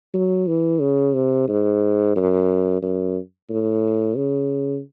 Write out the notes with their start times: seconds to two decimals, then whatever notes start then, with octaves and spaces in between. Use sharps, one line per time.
0.14 F#3
0.47 E3
0.81 C#3
1.15 C3
1.48 G#2
2.16 F#2
2.82 F#2
3.50 A2
4.17 C#3